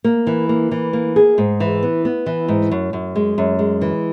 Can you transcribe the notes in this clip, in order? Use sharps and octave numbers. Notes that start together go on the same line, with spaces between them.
A#3
E3
A#3
E3
A#3
G#4
G#2
E3
B3
B3
E3
G#2
F#2
F#2
G#3
F#2
G#3
E3